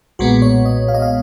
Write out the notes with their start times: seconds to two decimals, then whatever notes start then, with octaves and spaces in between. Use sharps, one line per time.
0.19 B1 A#2 G#3 B3 F#4
0.42 C#5
0.65 D#5
0.88 F5
0.94 D#5
1.02 F5